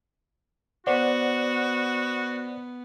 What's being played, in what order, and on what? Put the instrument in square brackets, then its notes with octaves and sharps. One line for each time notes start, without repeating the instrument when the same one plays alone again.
[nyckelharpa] B3 [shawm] F#4 [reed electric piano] C5 D5 F#5